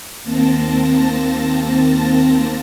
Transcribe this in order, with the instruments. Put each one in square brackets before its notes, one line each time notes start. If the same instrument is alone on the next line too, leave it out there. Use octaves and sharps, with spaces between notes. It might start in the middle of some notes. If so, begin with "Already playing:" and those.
[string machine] D#2 A#3 C4 A5 A#6